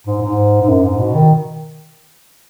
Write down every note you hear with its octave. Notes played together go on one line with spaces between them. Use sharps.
G#2
G#2
G#2
F#2
G#2
B2
D#3